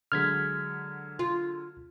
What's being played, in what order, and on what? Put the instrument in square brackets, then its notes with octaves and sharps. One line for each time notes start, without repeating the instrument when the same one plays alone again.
[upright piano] D3 F#3 G#3 [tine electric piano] F6 G#6 B6
[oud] F4